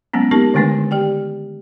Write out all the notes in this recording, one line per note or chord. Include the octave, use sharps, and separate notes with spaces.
F#3 G#3 A#3 B3 C#4
B3 C4 D#4 G4 A#4 A5
D3 D#3 G#3 A3 D4 B4
G4 D5 G5